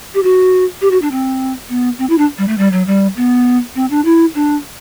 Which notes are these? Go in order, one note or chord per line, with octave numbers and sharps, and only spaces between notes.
G4
F#4
G4
F#4
D4
C4
B3
C4
E4
D4
G3
A3
G3
F#3
G3
B3
C4
D4
E4
D4